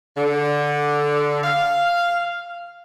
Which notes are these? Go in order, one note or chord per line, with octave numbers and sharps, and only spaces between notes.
D3
F5